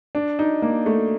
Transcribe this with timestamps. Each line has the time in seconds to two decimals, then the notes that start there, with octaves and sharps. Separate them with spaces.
0.15 D4
0.39 D#4
0.62 A#3
0.86 A3